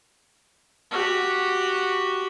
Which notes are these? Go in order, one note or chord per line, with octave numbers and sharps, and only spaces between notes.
F#4 G4